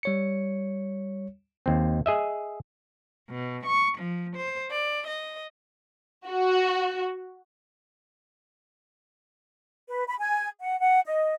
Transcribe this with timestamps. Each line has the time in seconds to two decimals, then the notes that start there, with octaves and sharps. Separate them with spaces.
0.03 G3 C#5 C#7
1.66 D#2 C4
2.06 G#4 D#5 E5
3.30 B2
3.65 C#6
3.98 F3
4.37 C5
4.72 D5
5.06 D#5
6.26 F#4
9.88 B4
10.06 B5
10.19 G#5
10.60 F#5
10.80 F#5
11.06 D#5